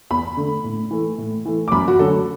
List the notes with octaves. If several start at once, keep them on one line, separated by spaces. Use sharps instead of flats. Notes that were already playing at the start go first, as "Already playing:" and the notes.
E2 B5
D3 A3
A2
E3 A3
A2
E3 A3
D6
F#2 B5
F#4
D3 F#3 A3 A4